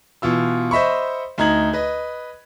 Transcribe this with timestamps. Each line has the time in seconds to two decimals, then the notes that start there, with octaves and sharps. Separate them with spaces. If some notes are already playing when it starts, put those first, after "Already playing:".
0.22 B2 E3 F4 E6
0.71 C5 D#5 E5 B5 C#6
1.38 D2 D#4 A#5 G#6 F#7
1.73 B4 D#5